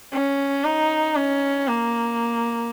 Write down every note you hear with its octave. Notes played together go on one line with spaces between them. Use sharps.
C#4
D#4
C#4
A#3